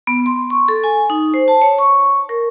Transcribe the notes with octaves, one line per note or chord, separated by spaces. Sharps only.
B3
C6
C#6
A4
G#5
D#4
C5
A5
C#5
C#6
A#4